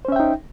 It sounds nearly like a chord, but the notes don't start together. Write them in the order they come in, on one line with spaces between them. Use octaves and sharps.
C5 C#4 E5 G5 D#4